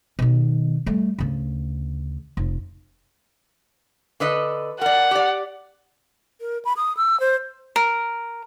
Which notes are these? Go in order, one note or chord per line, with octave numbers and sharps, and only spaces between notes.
B2 D#3
G3 A3
D2 C#3
F1
D3 B4 D#5
A#4 D5 F#5
G4 D5
A#4
B5
D#6
E6
C5
A#4